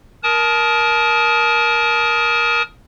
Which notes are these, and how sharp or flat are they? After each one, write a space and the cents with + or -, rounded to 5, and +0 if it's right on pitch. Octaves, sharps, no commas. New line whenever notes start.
A#4 +15 A5 -30 D#6 +10